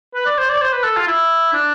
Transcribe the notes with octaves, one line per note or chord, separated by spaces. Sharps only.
B4
D5
C5
D5
C5
B4
A4
F4
E4
D4